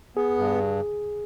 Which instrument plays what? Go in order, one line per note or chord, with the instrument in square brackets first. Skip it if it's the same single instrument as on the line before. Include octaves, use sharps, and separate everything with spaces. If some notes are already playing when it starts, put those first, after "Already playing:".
[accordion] B3 [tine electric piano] G#4
[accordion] G2